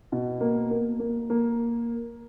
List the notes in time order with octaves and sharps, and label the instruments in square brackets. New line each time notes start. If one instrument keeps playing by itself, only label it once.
[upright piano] B2
A#3
A#3
A#3
A#3